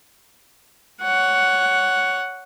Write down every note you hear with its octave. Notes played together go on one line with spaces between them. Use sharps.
C#5 F#5